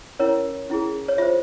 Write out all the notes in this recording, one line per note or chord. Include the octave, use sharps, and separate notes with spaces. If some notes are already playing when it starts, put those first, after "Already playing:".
C#4 E4 A#4 C#5
C#4 E4 G#4
C#5
F4 C5 E5